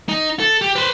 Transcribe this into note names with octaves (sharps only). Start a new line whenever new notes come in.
D#4
A4
G4
B4 C5